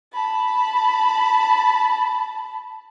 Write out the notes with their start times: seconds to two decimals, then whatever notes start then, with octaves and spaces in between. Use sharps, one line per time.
0.13 A5 B5